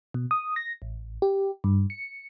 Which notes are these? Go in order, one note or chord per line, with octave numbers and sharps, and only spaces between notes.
B2
D#6
A#6
A1
G4
G2
C#7